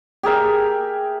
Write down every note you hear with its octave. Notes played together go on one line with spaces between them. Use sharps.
G4 G#4 A#4 E5